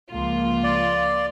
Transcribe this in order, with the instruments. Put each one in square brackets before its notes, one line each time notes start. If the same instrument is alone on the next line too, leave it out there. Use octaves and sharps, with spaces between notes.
[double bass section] C#2 F3 A#3 [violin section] F4
[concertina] D5